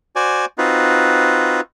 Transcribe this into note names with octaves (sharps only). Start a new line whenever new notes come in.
F#4 C5 D5 G#5
C4 D#4 F4 F#4 B4